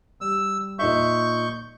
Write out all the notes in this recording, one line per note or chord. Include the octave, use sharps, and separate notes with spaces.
G3 E6
A#2 D#4 E5 C#6 G6